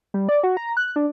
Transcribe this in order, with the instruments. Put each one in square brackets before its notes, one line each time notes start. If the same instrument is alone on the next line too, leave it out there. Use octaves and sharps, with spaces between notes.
[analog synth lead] G3
D5
F#4
A#5
F#6
D4